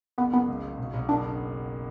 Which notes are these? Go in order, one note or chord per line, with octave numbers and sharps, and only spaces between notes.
F#1 B3
F#1 B3
C#2
C#2
B1
B1
F#1 D4